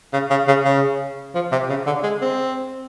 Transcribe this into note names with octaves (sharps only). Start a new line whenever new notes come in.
C#3
C#3
C#3
C#3
F3
C3
C#3
D3
G#3
C4